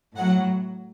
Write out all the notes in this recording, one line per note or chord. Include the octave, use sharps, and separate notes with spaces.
A2 F#3 F#5